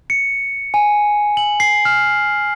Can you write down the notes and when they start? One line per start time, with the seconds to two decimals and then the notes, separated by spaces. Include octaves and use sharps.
0.10 C#7
0.74 G#5
1.37 F#7
1.60 C7
1.85 F6